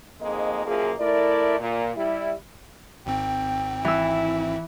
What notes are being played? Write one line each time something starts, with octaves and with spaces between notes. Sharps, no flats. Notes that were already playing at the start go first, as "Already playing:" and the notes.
F2 G#2 G#3 A#3 D#5
F#2 A#2 F3 A#3 G#4
A3 E4 A#4 D5
A#2
G3 E4
G#1 G#2 C4 G5
E3 E4 E6